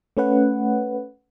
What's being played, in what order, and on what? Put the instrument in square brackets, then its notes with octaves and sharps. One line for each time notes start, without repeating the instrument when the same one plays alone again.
[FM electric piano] A3 C#4 B4 F#5